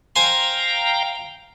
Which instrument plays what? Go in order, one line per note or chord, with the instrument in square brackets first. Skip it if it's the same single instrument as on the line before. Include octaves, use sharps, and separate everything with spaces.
[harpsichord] C5 G#5 C6 [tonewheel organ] F5 G5 A#5